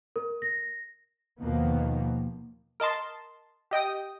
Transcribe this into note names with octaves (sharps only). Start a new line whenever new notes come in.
A#4
A#6
D#2 B2 D#3 F3 A#3 B3
A#4 D#5 A5 C6
G4 D#5 G5 D#6